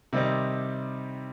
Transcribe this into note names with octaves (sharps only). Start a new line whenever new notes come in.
C3 D#3 G3 C4 D#4